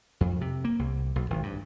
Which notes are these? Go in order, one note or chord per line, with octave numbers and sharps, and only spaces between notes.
F2
C3
A#3
C2
B1
G#1
G2